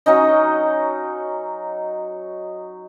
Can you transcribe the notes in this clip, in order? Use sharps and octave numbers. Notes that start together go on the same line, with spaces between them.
F#3 C#4 D#4 D#5